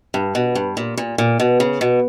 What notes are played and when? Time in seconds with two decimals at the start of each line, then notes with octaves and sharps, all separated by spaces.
0.14 G2
0.35 B2
0.55 G2
0.77 A#2
0.97 A#2
1.18 A#2
1.40 B2
1.60 C#3
1.81 B2